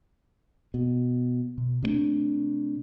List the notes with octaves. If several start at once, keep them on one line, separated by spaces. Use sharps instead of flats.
B2
B2
C3 G#3 A3 D4